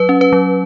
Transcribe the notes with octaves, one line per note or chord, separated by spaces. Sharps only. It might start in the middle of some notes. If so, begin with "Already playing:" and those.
Already playing: F#3 B4
C#4
B4
F#3